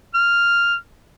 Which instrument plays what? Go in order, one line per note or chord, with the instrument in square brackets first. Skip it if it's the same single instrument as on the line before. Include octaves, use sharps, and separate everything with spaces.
[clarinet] F6